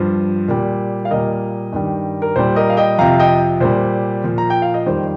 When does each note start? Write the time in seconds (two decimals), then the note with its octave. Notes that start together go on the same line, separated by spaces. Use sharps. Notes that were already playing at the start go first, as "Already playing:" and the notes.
Already playing: G2 F3 C5
0.48 A#2 G3
1.05 F5
1.11 A#2 G3 A#4 D#5
1.73 G2 D#3 G3
2.22 A#4
2.36 A#2 G3 C5
2.56 A#4 D#5
2.70 F5
2.77 D#5 G5
2.98 F2 C3 F3 F5 A#5
3.19 D#5 G5
3.60 A#2 G3 C5
4.24 A#2 F3
4.38 A#5
4.50 G5
4.62 F5
4.74 D#5
4.86 F2 D#3 G3 C5